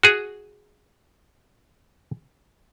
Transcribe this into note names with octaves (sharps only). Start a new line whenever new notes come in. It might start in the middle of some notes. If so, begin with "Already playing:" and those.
F#4 G#4